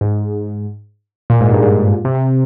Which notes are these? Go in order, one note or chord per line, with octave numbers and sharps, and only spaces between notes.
G#2
A#2
G#2
G2
G#2
C3
C3